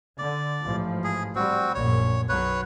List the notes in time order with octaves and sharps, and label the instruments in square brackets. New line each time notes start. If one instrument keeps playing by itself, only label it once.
[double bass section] D3 [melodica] D5
[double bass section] A1 G#2 F3
[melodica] G#4
[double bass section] G3 [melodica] C4 F#4
[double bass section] A#1 F#2 [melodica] C#5
[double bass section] B1 F#3 [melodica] B4 C#5